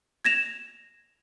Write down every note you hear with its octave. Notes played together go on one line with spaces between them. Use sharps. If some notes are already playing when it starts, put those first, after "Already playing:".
G#6 A#6 E7 F7